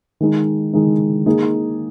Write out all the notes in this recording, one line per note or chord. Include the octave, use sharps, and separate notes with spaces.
D#3 G#3 D#4
D#3 G#3 D#4
A#3 D#4 G#4